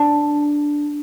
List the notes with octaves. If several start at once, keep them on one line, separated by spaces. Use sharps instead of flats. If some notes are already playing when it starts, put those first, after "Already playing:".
Already playing: D4